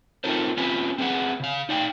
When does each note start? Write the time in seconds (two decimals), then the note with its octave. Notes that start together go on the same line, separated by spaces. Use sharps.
0.24 C4 D#4 F4 A4 A#4 C5
0.57 C4 C#4 F4 G4 B4 G#5
0.98 C4 G#4 B4 F#5
1.40 C#3 F5
1.69 D#4 D5 F5 G5